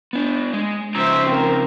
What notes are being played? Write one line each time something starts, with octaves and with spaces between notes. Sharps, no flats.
B3 D4
G#3
C#3 F3 C5 E5 A#5
C4 A#4